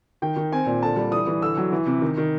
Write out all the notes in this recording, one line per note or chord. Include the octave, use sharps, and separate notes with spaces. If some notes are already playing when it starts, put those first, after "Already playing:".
D#3 G5
D#3
C4 G#5
A#2
D3 A5
G3
E3 D#6
E3
D3 E6
F#3
E3
C3
D#3
D#3